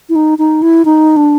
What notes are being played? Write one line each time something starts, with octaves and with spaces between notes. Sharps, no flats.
E4
D#4
D#4
E4
D#4
D4